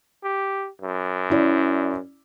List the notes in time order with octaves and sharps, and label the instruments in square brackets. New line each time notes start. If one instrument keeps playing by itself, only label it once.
[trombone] G4
F#2
[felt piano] C#4 E4 D5